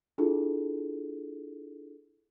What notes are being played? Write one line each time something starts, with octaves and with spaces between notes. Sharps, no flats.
D4 E4 F4 G#4 A4